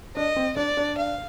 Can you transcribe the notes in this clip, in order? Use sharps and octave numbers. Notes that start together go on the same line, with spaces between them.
D4 D#5
C4
D4 D5
D4
F5